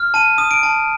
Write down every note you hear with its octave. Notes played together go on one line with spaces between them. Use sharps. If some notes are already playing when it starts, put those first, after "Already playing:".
Already playing: F6
A5 D#7
D#6
D7
A5